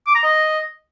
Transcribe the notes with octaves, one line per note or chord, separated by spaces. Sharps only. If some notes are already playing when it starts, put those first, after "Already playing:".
D6
A#5
D#5